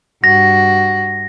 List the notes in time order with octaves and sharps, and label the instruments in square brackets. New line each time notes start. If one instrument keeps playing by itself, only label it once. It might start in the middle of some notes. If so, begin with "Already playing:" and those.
[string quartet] G2 F#4 [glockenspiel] A#6